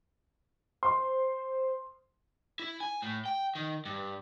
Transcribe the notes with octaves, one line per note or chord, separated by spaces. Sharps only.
C5 C6
E4
G#5
A2
G5
D#3
G2